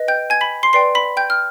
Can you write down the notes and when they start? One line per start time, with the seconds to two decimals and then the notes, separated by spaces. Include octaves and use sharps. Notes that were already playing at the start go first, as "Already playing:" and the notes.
Already playing: B4 D#5
0.08 G5 G6
0.30 G#5 G#6
0.41 B5 B6
0.63 C6 C7
0.73 B4 D5 G5 C6 C7
0.95 B5 B6
1.17 G5 G6
1.30 F6